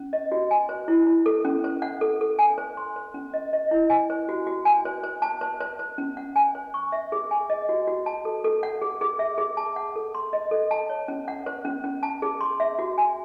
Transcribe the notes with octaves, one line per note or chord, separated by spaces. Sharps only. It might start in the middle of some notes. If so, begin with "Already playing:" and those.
Already playing: C#4
D#5
F#4
G#5
C5
E4
E4
A4
C#4
C5
F#5
A4
A4
G#5
C5
C6
C5
C#4
D#5
D#5
E4
G#5
C5
F#4
F#4
G#5
C5
C5
A5
C5
C5
C5
C#4
F#5
G#5
C5
C#6
E5
G#4
G#5
D#5
F#4
F#4
A5
A4
A4
F#5
G#4
G#4
E5
G#4
A5
F#5
A4
C6
D#5
A4
A5
C#5
C#4
F#5
C5
C#4
C#4
A5
G#4
C6
E5
F#4
G#5